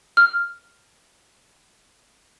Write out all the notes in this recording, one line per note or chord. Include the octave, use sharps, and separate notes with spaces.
F6